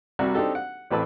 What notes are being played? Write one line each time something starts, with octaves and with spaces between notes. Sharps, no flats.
C2 C3 G3 F#4 F#6
C4 D4 D#4 G4 A4
F#5
A1 A2 C4 B4 A5 E6